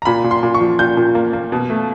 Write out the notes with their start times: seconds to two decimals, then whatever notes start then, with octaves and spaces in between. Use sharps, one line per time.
0.02 A#5
0.05 A#2 B5
0.24 A#2
0.31 C6
0.43 A#2
0.54 C#6
0.60 F3
0.79 A#2 G6
0.97 A#2
1.15 A#3
1.33 A#3
1.52 B2
1.70 A3